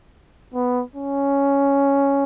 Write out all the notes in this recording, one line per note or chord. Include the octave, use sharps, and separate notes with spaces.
B3
C#4